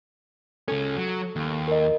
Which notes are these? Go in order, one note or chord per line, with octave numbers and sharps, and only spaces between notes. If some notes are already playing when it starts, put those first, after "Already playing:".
C#2 C#4 A4
F#3
D#2
A#4 D#5